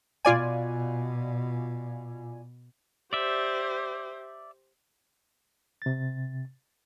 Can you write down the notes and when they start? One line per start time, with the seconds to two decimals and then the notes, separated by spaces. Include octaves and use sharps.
0.25 B2 F4 D5 G#5
3.13 G4 C5 D5 E5
5.82 C3 A6